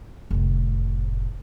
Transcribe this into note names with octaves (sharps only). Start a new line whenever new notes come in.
F1 A2